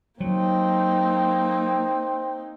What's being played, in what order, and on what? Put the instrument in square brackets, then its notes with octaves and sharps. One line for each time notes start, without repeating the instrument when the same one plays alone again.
[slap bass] F#3 [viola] A#3 D#4 [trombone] C4